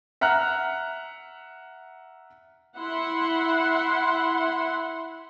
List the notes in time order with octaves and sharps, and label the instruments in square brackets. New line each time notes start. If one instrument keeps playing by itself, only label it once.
[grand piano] E5 F#5 A#5 F6 F#6
[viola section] E4 F#5 C6